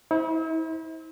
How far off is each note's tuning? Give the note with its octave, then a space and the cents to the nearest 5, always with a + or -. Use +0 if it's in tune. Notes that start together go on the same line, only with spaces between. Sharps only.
E4 -40 C5 +0